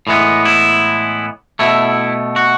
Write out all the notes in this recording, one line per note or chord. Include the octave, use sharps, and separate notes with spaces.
A2 E3 G#3 B3
E4
B2 A3 E4
F#4